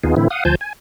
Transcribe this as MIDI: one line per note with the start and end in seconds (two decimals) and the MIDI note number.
0.04 0.15 39
0.04 0.15 59
0.04 0.15 63
0.04 0.15 65
0.04 0.15 68
0.17 0.28 45
0.17 0.28 50
0.17 0.28 52
0.17 0.28 60
0.17 0.28 64
0.30 0.44 77
0.30 0.44 78
0.30 0.44 87
0.45 0.55 38
0.45 0.55 53
0.45 0.55 72
0.45 0.55 80
0.45 0.55 81
0.45 0.55 91
0.61 0.73 80